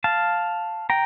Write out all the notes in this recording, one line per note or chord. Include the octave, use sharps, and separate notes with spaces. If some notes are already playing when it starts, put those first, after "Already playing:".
F5 A5
G5 A#5